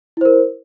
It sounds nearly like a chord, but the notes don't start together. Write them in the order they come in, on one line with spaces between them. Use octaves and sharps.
E4 C5 A#4